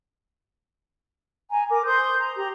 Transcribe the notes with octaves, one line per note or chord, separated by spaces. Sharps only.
G#5 A#5
A#4 D6
C5 C6 D#6 G6
A#5
G4 A#5